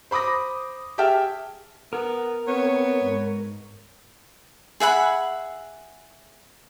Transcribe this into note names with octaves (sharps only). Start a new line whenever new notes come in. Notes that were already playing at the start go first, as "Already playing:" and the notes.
C5 B5 D6 D#6 A#6
G4 G#4 E5 G5 A5 F6
B3 A#4
B3 C4 C#5
G#2
G#4 E5 F#5 B5